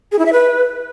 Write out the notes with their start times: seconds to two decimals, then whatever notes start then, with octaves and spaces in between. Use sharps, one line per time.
0.12 G#4
0.19 E4
0.26 E5
0.33 B4